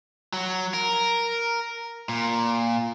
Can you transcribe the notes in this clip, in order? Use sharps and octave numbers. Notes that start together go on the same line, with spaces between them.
F#3
A#4
A#2